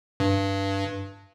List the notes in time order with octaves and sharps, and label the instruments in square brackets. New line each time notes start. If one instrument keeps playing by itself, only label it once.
[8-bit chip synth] G2